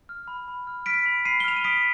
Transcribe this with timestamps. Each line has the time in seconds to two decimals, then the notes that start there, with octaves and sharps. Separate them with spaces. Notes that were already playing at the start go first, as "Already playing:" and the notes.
0.09 F6
0.28 B5
0.48 B5
0.67 F6
0.86 F6 B6 D7
1.06 B5
1.25 B5 C7 D#7
1.40 G7
1.44 F6 F7
1.57 D#7
1.64 D#6 B6 D7